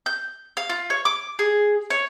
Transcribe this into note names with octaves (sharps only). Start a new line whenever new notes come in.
G6
F5
F4
C#5
D6
G#4
C#5